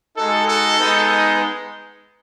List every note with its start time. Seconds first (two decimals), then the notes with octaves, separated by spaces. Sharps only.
0.17 G#3 D#4 F#4 A4
0.48 A4
0.80 G#3 B3 D#4